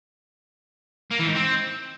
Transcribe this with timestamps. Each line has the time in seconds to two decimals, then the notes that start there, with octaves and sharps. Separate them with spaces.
1.11 A#3
1.19 E3
1.27 G#2
1.35 C4